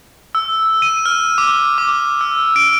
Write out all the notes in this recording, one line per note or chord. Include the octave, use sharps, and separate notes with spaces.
E6
D#7
F6
D6
D6
E6
D7